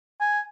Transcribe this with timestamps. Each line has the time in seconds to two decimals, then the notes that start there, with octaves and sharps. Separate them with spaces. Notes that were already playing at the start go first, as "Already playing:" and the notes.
0.21 G#5